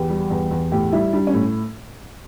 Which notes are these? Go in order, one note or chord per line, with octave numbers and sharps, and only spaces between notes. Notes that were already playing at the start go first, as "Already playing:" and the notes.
Already playing: E2 G4
G3
E2
E2
A2 G4
G3 E4
G3 D4
C#4
A2